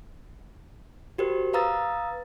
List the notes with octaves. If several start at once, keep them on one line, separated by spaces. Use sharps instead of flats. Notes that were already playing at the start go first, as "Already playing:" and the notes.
F#4 G4 A#4 C5
B4 F5 A#5 D#6 E6 A6